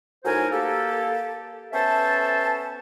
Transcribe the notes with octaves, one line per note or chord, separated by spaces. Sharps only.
A2 F#3 D#4 A#4 C5 G#5
A#3 G4 A4
B3 C#4 A4 C5 E5 A5